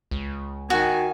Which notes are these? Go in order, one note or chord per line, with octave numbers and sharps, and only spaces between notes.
C#2
D#3 F#4 G#5